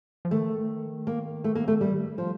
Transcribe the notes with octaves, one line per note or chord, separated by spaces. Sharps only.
F3
D#3 A3
A#3
A3
A#3
A3
G3
F3